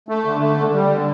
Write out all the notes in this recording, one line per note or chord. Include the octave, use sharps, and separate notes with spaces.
A3
D3
A3
D3
G3
D3